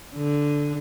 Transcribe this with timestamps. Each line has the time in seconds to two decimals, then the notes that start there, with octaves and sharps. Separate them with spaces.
0.16 D3